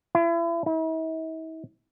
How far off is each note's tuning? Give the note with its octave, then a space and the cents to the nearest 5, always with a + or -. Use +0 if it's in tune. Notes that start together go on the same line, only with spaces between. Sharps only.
E4 +35
E4 -45